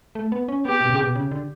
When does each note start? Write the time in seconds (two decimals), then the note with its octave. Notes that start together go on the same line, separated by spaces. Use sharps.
0.15 A3
0.32 B3
0.48 C#4
0.65 B3 G4
0.81 B2
0.90 C#3
1.03 B2
1.16 C#3
1.32 D3